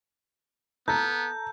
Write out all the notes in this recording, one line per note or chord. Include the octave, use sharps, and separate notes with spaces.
B3 A4 A#5 G6